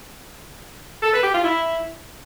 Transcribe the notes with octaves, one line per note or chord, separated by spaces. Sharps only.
A4
B4
G4
F4
E4